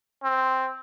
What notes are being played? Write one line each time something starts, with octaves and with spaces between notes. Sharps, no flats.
C4